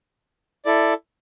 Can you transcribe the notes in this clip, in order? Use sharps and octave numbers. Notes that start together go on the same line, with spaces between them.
E4 A4 D5